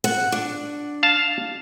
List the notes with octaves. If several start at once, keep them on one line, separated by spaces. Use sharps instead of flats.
F#5
D4
F5 A5